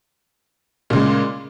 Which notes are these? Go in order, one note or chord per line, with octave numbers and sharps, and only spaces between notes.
A#2 C#3 G#3